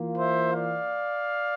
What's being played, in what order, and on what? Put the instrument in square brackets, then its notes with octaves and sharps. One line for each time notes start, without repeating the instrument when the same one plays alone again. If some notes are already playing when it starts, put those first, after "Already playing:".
Already playing: [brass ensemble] E3 A#3 F4
C5 E5
D5 F5